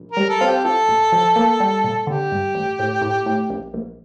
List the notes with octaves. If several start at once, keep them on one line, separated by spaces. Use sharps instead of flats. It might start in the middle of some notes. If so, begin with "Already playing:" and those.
Already playing: A#1
A#4
G3
A4
C4 F4
G4
F3 A4
A#1
F3
A#3
G3
A#2
D3 G4
G2
A1
A2
A2
A2
A#1
A#1